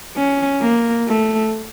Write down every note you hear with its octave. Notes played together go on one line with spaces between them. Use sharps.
C#4
A#3
A3